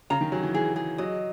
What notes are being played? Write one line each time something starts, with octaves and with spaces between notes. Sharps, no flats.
C#3 A#5
D#3
F#3 G#4
E3
E3 G#4
G#4
F#3 D#5